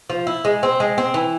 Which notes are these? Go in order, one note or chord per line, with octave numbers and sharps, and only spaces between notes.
F3
E4
G#3
C4
G#3
C4
E3